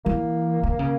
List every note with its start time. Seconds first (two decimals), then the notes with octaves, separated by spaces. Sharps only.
0.05 E3 A#3
0.63 D3
0.79 C#3